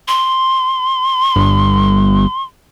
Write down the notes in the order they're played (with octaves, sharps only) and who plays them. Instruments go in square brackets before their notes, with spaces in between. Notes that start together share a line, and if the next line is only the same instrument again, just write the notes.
[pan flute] C6
[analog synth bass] G1